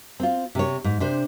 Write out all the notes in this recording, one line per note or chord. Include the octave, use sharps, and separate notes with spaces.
C4 F4
C3 C#5
G#2
C3 D4 C5